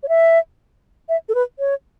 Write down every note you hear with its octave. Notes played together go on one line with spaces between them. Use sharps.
C#5
E5
E5
A4
B4
C#5